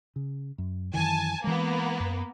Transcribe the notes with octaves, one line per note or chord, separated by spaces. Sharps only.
C#3
F#2
F#2 D#3 E3 G#5 A5
E3 G#3 A#3 B3
F#2